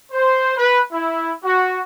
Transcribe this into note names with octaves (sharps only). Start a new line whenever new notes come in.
C5
B4
E4
F#4